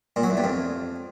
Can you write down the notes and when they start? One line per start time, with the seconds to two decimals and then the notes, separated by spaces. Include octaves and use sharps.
0.16 A#2
0.23 F#3
0.30 E2
0.37 G2
0.44 F2